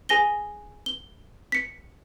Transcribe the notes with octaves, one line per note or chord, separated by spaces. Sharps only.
G#4 G#5 A#6 G7
G7
B6 C#7